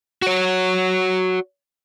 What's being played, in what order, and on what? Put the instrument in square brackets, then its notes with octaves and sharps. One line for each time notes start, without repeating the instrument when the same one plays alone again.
[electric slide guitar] F#4 C#5